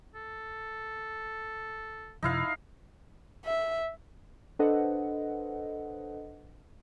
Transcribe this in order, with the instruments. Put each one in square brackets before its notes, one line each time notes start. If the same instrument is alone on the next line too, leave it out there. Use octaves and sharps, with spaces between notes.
[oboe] A4
[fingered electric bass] F#2 C3 F3 [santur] D#4 E4 F5
[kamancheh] E5
[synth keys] D4 A4 B4 C5 D#5 F#5